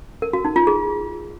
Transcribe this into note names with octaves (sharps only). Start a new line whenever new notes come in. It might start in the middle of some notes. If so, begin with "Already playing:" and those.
A#4
F#4
D#4
F4
G#4